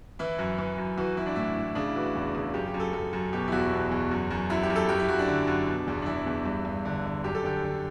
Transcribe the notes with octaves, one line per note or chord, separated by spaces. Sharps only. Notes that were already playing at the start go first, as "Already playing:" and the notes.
E3 E4
F#2
E3
F#2
E3 F#4
E3 E4
D4
A2 E4
A2
C#3 D4
E4
E3 F#4
E2
C#3
F#2 G4
G4
F#2
A4
F#2 A4
F#2
B2 G4
E4
E2 F#4
B2
E2
F#2
F#2
F#2 E4
G4
F#2
A4
F#2 G4
E4
F#2 F#4
D4
D3
F#2
B2
E2
D4
E2 E4
E2
G2
G2
D3
D3
F#2 G4
A4
D3 G4
D3